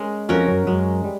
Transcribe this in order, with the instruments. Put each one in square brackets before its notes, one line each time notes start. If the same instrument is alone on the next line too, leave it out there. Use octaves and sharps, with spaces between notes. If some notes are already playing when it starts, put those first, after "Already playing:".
Already playing: [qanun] G#3 C#4 A#4
[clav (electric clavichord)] F2 F3 [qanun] C#4 F#4 A#4
[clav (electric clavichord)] F#2 F#3
[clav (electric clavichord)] F#2 F#3 [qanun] G#3
[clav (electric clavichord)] G3